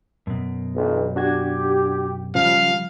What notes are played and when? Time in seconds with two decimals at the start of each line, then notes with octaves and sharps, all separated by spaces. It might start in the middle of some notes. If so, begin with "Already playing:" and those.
0.27 F#2 B2
0.75 B1 G2 E3
1.16 D4 F#4 G4 G#6
2.35 C#3 F3 G3 F5